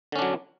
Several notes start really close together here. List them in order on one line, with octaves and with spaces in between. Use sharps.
D3 C#4 D4 F#3